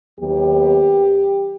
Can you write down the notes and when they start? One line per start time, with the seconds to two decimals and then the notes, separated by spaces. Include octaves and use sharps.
0.19 D#2 D#3 F#3 B3 G4